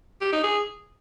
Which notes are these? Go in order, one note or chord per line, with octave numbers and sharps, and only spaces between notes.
G4
D#4
G#4